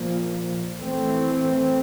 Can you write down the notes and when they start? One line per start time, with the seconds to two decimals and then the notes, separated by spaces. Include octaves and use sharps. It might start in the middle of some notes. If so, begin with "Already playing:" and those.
Already playing: A#2 F3 A#3
0.78 E3 A3 C4